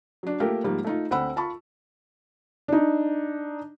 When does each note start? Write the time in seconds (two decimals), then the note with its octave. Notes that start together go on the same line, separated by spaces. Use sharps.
0.23 F#3 D4
0.40 A3 A#3 F4 G4 A#4
0.64 G#2 F3 G3 A#3
0.85 A3 D#4 F4
1.11 D2 C4 F#5 B5 E6
1.36 F4 A5 B5 C#6
2.68 D4 D#4